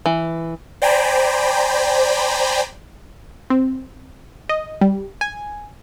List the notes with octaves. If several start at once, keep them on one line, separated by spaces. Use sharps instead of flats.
E3
C5 D5 G5 G#5 A#5 B5
C4
D#5
G3
G#5